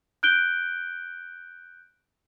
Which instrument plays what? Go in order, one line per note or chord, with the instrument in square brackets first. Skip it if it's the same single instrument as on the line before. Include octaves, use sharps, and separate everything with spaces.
[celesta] F#6 G6 D7 G7